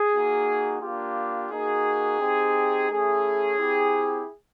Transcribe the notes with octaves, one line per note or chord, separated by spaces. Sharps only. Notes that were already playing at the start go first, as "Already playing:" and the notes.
Already playing: G#4
A#3 D#4 F#4
A#3 D4 F4 G4
A#3 D#4 F#4 G#4
C4 D#4 G4
A3 C#4 E4 G#4
C4 E4 G4